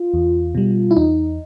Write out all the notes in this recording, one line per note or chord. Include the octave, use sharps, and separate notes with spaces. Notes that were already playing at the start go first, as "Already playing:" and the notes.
Already playing: F4
E2
B2 G3
E4
E2 D#4